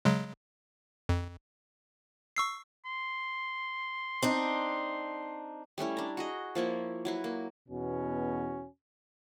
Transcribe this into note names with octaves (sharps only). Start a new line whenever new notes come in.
C#3 F#3 G#3
F2
C#6 E6 C7
C6
C4 D4 D#4
G3 A3 C#4 E4
D4 A#5
F#4 G#4 D#5
F3 A#3 E4 C#5
F#3 E4 B4
A#3
E2 B2 C#4 F#4